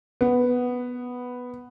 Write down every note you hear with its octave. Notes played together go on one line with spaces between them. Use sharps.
B3